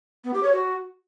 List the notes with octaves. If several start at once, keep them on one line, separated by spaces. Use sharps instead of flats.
B3
G4
C#5
F#4